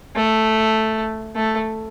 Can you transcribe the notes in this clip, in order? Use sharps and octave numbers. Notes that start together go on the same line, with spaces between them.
A3
A3